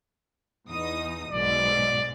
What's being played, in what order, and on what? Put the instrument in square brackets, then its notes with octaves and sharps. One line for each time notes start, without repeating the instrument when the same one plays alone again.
[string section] E2 D#4 D#6
[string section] B1 G#2 [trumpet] D5